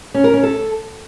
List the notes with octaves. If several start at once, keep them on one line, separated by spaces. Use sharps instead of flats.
C#4
A#4
C#4
A4